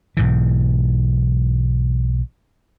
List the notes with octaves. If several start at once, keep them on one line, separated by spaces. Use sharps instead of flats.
B1 G#2 E3